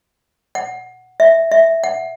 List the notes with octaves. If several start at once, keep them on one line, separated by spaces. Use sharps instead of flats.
F#5
E5
E5
F#5